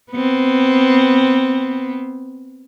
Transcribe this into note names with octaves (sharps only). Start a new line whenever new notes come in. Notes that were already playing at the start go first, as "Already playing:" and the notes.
B3 C4